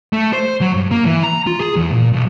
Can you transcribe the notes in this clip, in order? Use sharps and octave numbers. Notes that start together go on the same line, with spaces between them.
A3
C5
F#3
G2
A#3
E3
A#5
F4
G#4
E2
A#2
B1